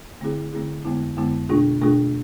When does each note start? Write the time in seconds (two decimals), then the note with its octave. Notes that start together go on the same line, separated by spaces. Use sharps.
0.21 D3 A3 C4 E4 G#4
0.53 D3 A3 C4 E4 G#4
0.85 F2 D3 G#3 B3 E4
1.17 F2 D3 G#3 B3 E4
1.49 B2 A3 D4 F4 G#4
1.81 B2 A3 D4 F4 G#4